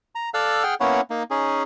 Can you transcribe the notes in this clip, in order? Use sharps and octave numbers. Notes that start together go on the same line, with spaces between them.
A#5
A4 D5 F5 E6 F#6
G#4 F#5 G5 F6
A#3 B3 C#4 E4 C#5 F#5
A#3 D#4
C#4 D#4 G#4